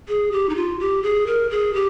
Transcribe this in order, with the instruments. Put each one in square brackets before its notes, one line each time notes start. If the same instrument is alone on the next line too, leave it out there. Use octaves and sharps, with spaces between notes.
[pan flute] G#4
G4
D#4
F4
G4
G#4
A#4
G#4
G4